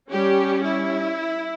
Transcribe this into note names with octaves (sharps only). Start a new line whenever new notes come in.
G3 C#4 G4
E4